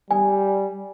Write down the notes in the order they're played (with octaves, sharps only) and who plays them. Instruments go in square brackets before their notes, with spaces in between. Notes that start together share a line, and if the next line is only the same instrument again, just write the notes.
[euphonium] G3 [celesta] G#5